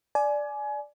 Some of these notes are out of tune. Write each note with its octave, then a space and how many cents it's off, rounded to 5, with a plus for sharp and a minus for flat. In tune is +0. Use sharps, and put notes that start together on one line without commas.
D5 +0 G#5 +25